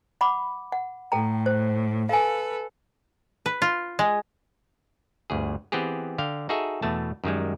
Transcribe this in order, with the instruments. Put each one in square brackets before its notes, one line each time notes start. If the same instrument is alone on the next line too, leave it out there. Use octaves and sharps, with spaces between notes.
[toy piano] F#5 B5 D6
F#5
[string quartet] A2 [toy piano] A4 G5 A#5
[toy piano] C5
[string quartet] A4 B4 [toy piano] F5 G#5
[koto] B4
F4
G#3
[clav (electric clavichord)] G1 D2 G#4
E3 B3 C4 G4 G#4
D3 F5 G5
D#4 F#4 G#4 A4 E5
E2 B2 A3 A5
F#2 D#3 G3 G#3